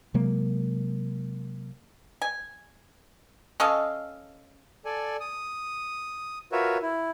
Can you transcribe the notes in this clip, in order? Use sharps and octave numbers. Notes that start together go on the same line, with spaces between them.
C3 F#3 G#3 A#3
G#5
C#4 A4 D#5 F5
A4 D5 G#5
D#6
F4 F#4 A#4 B4 C#5 E5
E4